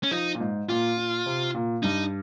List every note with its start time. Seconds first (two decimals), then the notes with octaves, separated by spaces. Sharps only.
0.03 C#4
0.11 F3 D#4
0.35 A#2
0.40 G#2
0.69 A#2 F4
0.97 A#2
1.26 C3
1.54 A#2
1.83 G2 D#4